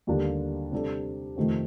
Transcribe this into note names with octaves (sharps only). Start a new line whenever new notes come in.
D#2 D3 G3 A#3 D4
C3 G3 D4 A4
F2 C3 D#3 A3 C4